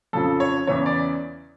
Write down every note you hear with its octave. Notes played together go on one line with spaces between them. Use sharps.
F2 C#3 F3 A4
C#5
E2 C#3 E3 C#5
D5